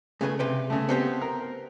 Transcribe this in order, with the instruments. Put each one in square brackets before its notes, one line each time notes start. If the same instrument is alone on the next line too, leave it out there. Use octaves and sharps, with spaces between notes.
[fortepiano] C#3 G#5 [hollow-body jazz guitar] A3 G#4 B4
[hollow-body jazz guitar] C3 B4 G5
[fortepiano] C#3 A3
[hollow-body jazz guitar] B3 C4 G4
[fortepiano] A#4